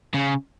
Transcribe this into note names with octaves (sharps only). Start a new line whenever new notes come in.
C#3